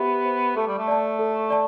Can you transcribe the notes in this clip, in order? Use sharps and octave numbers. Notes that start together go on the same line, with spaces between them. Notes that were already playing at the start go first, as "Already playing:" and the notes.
Already playing: B3 G4 C5 E5
C5 E5
A3 A4
G3
A3
D5 A5
A4
D5 A5